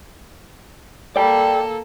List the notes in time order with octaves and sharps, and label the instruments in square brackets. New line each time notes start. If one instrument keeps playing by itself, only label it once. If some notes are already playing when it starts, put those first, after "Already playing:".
[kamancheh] A#3 A4 [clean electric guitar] D5 G5